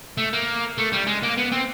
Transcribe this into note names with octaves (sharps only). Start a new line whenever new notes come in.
A3
A#3
A3
G3
G#3
A#3
B3
C4